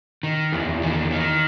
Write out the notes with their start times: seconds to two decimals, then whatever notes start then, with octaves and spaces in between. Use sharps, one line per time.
0.23 D#3
0.52 E2
0.82 D#3
1.11 D#3